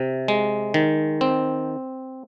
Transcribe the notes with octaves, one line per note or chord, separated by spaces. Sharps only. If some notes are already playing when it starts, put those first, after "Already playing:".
Already playing: C3
G#3
D#3
C4